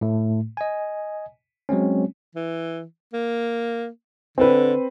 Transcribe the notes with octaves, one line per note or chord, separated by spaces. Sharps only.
A2 A3
D#5 G#5
F#3 G#3 C4 C#4
E3
A#3
D3 C4 B4